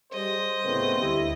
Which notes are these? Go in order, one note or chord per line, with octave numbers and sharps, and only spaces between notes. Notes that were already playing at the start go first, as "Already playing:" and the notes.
G3 G#4 C5 D#5
C2 A2 C#3 A3 B3 C4
D2 G3 E4 G4